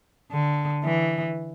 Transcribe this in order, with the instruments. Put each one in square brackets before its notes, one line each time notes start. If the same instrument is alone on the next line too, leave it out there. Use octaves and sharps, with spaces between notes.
[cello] D3
E3